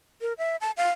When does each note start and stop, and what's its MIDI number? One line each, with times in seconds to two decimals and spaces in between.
0.21 0.33 70
0.38 0.56 76
0.61 0.71 81
0.77 0.91 77